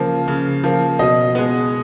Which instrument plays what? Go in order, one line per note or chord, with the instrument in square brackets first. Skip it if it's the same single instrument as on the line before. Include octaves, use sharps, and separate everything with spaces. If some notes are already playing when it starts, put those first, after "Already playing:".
Already playing: [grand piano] C#3 F3 A#3
C#3
F3 A#3
B2 D#5
G#3 B3